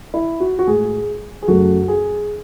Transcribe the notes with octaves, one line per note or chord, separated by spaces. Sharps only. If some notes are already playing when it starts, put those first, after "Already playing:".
E4
F#4
F#4
A2 G#3 G#4
G#4
F#2 C#3 F#3 A3 F#4
G#4